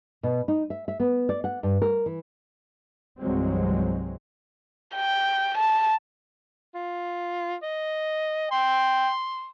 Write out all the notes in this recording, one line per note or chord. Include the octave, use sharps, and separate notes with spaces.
B2
D#4
E5
E5
B3
D5
F#5
G2
A#4
E3
C2 G2 E3 F#3 G#3 C4
G5
A5
F4
D#5
G5 C6